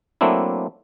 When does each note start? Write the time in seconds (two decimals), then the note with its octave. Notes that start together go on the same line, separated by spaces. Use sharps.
0.21 F#3 A3 A#3 C4 D4 E4